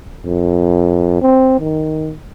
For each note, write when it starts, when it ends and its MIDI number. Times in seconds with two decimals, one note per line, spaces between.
0.26 1.17 41
1.21 1.58 60
1.59 2.14 51